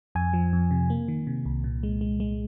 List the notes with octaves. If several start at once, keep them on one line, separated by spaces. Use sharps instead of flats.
F2 G#5
F3
F2
C3
A#3
D#3
C3
C2
A#2
G#3
G#3
G#3